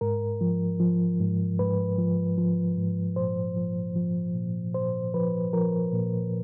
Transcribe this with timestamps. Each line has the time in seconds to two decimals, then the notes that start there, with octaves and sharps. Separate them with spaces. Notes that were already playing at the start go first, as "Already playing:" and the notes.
0.01 G#2 A#4
0.41 F3
0.80 F3
1.20 G#2
1.59 G#2 B4
1.98 F3
2.38 F3
2.77 G#2
3.16 A#2 C5
3.56 F3
3.95 F3
4.35 A#2
4.74 A#2 C5
5.14 F3 B4
5.53 F3 A#4
5.93 A#2